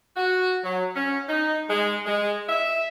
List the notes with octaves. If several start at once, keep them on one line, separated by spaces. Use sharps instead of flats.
F#4
F#3
C#4
D#4
G#3
G#3
E5